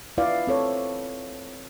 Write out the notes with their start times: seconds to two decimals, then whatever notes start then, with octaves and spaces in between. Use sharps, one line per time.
0.18 E4 F4 B4 D5 F5
0.47 C4 A4 C#5